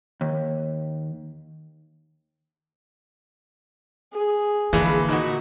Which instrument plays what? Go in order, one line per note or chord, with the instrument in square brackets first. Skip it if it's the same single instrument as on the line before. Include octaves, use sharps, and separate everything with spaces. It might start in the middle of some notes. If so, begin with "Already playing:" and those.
[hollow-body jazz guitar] D#2
[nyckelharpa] G#4
[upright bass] D3 A#3 [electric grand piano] E3 [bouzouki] F3 G#3 B4
[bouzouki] A#2 E4 F#4 [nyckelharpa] D#4